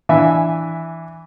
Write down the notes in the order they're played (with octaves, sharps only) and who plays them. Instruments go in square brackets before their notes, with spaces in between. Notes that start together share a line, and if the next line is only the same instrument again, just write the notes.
[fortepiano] E3 D4 E5 G#5